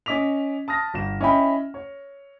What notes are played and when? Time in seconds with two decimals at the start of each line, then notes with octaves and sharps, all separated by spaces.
0.06 C#4 D#5 D6 B6 F7
0.68 A5 D#6 F6 A#6
0.94 G1 E7
1.21 C#4 E4 D#5 E5 G5 B5
1.74 C#5